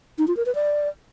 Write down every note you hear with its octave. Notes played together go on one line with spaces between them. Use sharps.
D#4
F4
A#4
B4
D5